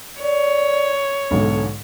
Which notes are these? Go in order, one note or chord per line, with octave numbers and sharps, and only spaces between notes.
C#5 D5
B1 G#2 D3 B3